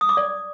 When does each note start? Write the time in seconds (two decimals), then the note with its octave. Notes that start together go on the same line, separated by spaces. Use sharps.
0.01 D#6
0.09 D6
0.17 D5